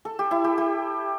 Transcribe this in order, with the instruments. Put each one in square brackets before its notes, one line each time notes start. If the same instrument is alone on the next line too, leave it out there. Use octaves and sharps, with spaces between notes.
[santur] A4
G4
E4
G4
G4